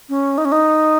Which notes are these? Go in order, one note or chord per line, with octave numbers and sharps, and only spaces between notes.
C#4
D#4
C#4
D#4